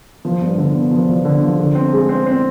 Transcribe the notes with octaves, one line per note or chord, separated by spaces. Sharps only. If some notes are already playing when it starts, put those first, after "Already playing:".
F3
G2
D3
B3
F3
F3
D3
F3
D3
C4
G#3
C4
C4